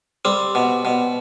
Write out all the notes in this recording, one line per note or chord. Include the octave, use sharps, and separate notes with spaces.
G3 C4
B2
B2